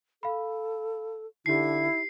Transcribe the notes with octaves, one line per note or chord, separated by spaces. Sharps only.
A4 F5 B5
D3 D#4 E4 G4 C7